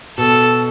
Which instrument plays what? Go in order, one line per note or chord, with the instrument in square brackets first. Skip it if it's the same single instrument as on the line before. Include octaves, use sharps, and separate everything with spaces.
[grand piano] B2 [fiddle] A4